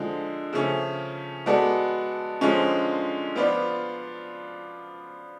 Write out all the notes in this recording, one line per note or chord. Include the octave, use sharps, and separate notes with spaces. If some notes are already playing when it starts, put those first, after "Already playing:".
Already playing: D3 F3 G#3
C#3 F3 A3 C#4
G#3 B3 F#4 A4 D5
D3 F3 G#3 C#4 F4
F3 B3 F4 B4 D5